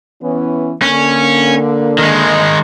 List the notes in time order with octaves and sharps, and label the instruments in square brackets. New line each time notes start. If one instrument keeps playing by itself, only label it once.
[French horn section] E3 B3 C#4
[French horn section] D3 A#3 [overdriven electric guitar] C#4
[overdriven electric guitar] D#3 G#3